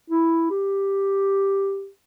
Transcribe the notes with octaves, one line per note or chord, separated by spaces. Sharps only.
E4
G4